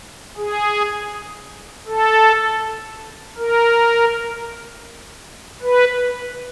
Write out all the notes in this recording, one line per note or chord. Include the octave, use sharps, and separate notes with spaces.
G#4
A4
A#4
B4